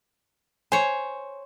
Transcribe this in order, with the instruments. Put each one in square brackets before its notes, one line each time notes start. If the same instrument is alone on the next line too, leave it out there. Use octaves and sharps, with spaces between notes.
[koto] C5 C#5 [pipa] G#5